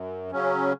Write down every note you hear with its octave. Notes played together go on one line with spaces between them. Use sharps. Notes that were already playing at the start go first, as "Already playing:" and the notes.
Already playing: F#2
C#3 F#3 C#4